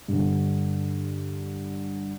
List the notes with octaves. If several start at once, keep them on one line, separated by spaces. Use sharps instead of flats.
G2 D3